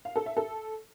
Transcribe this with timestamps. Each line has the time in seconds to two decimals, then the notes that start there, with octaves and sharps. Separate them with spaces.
0.05 F5
0.16 A4
0.26 E5
0.37 A4